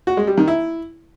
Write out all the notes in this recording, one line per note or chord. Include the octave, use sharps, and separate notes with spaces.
F#4
G#3
G3
D#3
E4